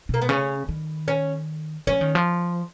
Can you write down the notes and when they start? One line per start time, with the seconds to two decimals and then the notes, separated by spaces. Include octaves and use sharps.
0.09 B2 A#3
0.22 B3
0.29 C#3 C#4
0.69 D#3
1.08 C#4
1.87 F3 C#4
2.01 D#3
2.15 F3